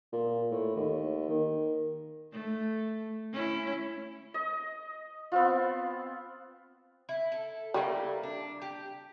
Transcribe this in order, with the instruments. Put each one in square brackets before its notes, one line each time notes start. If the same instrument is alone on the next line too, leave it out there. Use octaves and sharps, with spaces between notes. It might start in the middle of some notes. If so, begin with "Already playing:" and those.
[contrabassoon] A#2
A2
D#2
D#3
[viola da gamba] A3
C#4 E4
[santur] D#5
B3 C4 F4
[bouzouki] E4
A4
[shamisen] G3 [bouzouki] A3 A#3 E4
[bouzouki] D4
G4